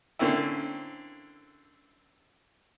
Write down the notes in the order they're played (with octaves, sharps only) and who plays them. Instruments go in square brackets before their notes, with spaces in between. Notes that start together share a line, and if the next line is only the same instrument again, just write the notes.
[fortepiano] D3 A#3 C4 C#4 E4